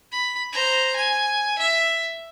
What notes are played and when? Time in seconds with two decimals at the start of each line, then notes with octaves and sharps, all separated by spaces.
0.12 B5
0.52 C5 A#5
0.96 G#5
1.59 E5